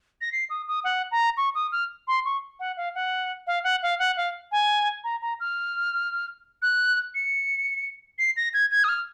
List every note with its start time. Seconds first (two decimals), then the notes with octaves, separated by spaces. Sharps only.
0.21 A#6
0.32 C7
0.50 D#6
0.68 D#6
0.84 F#5
1.12 A#5
1.37 C#6
1.55 D#6
1.72 F6
2.08 C6
2.25 C#6
2.60 F#5
2.77 F5
2.95 F#5
3.47 F5
3.64 F#5
3.83 F5
3.99 F#5
4.17 F5
4.52 G#5
5.04 A#5
5.22 A#5
5.40 F6
6.62 F#6
7.15 C#7
8.19 C7
8.37 A#6
8.54 G#6
8.71 G#6
8.84 D#6
8.88 F6